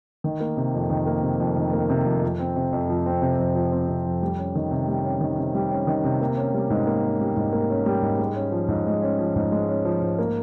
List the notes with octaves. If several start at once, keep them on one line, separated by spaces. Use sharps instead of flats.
D#3
A#3
C3
F2
D#3
A#3
C3
F2
D#3
A#3
C3
F2
F3
C4
C3
F2
F3
C4
C3
F2
F3
C4
C3
F2
G3
C#4
D#3
C3
G3
C#4
D#3
C3
G3
C#4
D#3
C3
A#3
C#4
G3
G#2
A#3
C#4
G3
G#2
A#3
C#4
G3
G#2
G#3
C#4
F3
G#2
G#3
C#4
F3
G#2
G#3
C#4
F3
G#2
A#3